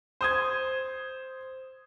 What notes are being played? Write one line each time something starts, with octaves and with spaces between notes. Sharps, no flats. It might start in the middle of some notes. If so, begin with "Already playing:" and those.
C5 D#6 G#6